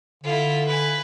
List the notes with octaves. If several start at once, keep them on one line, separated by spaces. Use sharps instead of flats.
D3 E4 F4
B4 G#5